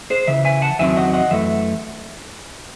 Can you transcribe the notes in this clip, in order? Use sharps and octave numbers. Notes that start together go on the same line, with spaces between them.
G#4 C5
C#3 E3 E5
E5 G#5
F#5 A5
E2 D#3 F#3 C4 E5 G#5
D#5 F#5
D#5 F#5
F#2 E3 A3 E5